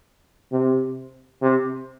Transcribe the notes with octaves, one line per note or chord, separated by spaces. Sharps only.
C3
C3